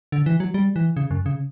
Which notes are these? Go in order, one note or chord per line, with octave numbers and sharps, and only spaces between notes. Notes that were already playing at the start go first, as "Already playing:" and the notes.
D3
E3
F#3
G3
E3
C#3
F#2
C#3